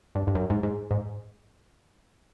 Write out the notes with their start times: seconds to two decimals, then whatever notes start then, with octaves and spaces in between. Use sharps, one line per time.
0.15 G2
0.27 G2
0.35 F#2
0.50 G#2
0.63 G#2
0.91 G#2